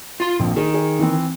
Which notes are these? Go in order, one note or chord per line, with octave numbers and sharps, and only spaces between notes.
F4 C6
A#1 F2
D#3 G#4
G#4
E3 C4